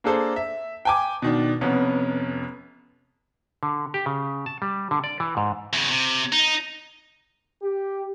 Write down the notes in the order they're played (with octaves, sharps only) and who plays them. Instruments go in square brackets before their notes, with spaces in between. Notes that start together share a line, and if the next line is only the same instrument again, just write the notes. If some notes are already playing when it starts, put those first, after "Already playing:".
[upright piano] A#3 D4 G#4 A4 C5
E5
G5 G#5 D6
B2 D#3 D4
F1 F2 B3 C#4
[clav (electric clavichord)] D3
G4
C#3
A5
G3
D3
D5
E3
G#2
[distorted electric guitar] E2 C#3
C3
D#4
[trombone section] G4